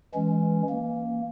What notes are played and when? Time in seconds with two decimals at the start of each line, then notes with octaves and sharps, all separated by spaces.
0.14 E3 G#3 C#4
0.70 A#3